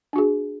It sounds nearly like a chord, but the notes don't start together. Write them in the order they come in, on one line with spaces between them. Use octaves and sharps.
D4 F#4 G#4